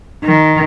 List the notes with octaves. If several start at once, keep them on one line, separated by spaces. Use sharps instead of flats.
D#3